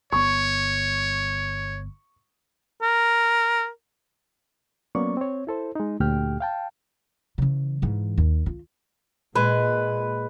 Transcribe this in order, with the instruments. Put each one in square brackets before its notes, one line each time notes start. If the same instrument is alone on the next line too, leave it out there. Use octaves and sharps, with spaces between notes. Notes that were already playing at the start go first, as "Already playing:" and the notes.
[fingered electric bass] G1 B3 [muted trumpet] C#5 [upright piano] C#6
[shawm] A#4
[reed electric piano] F#3 A#3 B3 C#4 D5 C#6
C4 C#5
E4 A4 C5
G#3 D#4
D2 A#2 A3 G4 G5 F6
F5 G5 A5
[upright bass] C#3 E3
G#2 E3
D#2
F4
[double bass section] A#2 [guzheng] G#3 [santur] B4